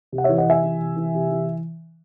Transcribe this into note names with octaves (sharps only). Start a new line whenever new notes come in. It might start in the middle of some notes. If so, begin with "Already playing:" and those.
C3
F#5
E3 C#5 E5
D#5 F#5
C3 E5 G#5
E3
C3
E3
C3
E3